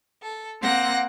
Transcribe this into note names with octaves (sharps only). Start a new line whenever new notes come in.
A4
A#3 C4 F#5 A#6